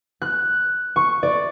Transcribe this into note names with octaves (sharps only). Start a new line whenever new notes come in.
F#6
C#6
D5